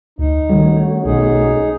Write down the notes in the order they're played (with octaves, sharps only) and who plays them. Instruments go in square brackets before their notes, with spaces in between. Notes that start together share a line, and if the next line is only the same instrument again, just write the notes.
[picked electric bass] D2 [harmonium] D#4
[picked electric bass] D#3 G3 [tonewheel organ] A3 C#4 F#4
[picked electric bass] B1 [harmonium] D#4 G#4